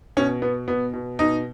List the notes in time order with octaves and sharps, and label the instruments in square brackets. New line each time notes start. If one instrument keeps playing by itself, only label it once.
[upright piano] B2 C#4
B2 B3
B2 B3
B2
B2 D#4